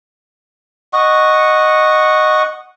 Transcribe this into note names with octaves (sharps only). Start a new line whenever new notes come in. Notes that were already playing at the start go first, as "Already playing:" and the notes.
D#5 F#5 C#6